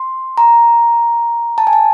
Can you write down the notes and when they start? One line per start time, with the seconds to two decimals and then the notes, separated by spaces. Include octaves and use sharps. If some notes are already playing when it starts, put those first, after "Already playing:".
Already playing: C6
0.38 A#5
1.58 A5
1.67 G#5
1.73 A5